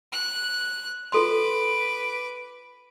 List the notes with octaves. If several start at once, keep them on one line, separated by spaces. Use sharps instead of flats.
F#6
F4 A4 B4 C6 D6